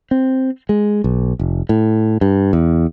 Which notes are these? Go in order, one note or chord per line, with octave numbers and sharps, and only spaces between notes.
C4
G#3
B1
F1
A2
G2
E2